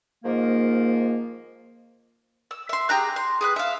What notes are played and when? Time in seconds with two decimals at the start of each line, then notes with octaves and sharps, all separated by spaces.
0.24 G#2 D#3 F3 A#3
2.51 E6
2.69 E5 C6
2.89 G4 G#4 A#5 F#6
3.16 C6
3.41 G#4 B4 F#6
3.56 E5 F5